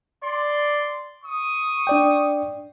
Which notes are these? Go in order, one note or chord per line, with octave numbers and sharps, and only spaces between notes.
D5 C6
C#6 D#6
D4 D5 G5